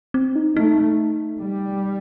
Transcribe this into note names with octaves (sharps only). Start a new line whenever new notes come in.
C4
D#4
A3 D#4
G3